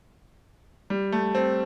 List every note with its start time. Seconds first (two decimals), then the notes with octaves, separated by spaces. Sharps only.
0.90 G3
1.12 A3
1.35 C4